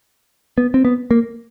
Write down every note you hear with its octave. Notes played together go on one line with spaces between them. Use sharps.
B3
C4
B3
A#3